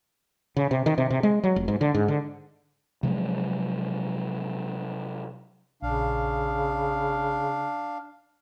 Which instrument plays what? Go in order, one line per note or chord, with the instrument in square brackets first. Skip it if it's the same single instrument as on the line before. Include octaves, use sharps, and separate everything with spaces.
[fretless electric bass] C#3
C3
D#3
C3
C3
G#3
F#3
F1
G#2
D3
G#2
D3
[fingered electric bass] C3 F3 F#3 G#3
[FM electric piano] A#1 [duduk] C#3 [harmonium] D4 F5